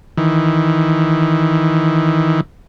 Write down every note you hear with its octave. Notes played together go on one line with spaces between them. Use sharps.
D#3 E3